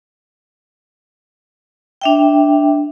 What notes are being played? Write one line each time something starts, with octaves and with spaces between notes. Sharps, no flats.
D4 E5 G5